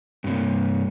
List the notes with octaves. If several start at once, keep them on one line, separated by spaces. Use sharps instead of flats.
G2 C3